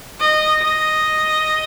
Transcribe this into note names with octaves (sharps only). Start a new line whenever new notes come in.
D#5
D#5